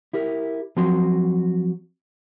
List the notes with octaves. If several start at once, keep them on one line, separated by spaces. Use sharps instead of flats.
E4 G4 A#4
F3 F#3 C4 F#4 C6